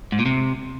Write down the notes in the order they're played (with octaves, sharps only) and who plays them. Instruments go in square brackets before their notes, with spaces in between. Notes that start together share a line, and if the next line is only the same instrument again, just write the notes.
[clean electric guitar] G#2
A#2
C3